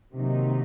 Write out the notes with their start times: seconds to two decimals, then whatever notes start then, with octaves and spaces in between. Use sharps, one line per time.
0.14 C3 D#3 F#3 A#3 D#4